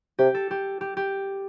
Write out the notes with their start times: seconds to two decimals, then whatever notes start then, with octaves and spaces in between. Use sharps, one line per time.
0.19 C3 G4
0.35 A4
0.51 G4
0.81 G4
0.97 G4